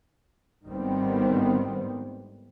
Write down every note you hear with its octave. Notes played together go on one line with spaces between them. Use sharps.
G#1 A2 D#3 G3 B3 C4